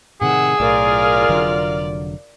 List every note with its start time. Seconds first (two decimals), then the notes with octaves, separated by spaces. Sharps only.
0.21 A2 C3 D#3 G#4 F#5 E6
0.60 B1 A2 F4 A#4 D5 F6
1.29 F1 D3 F#3